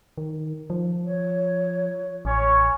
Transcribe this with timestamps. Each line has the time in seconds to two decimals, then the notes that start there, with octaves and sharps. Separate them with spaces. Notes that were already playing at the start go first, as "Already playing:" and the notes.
0.18 D#3
0.70 F3
1.05 C#5
2.25 A1 C#4 C#5